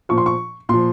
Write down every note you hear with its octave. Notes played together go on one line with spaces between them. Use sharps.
A#2 F3 C#6
C6
C#6
A#2 F3 C6